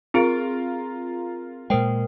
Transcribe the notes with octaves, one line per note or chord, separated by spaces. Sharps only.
C4 F4 G#4 A#4 D7
A#2 G#3 A#4 C5 G5